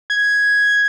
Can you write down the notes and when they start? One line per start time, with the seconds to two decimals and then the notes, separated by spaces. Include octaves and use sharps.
0.10 G#6